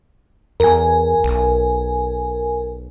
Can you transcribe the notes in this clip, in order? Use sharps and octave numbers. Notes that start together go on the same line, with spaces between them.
E2 A#4 G#5
B1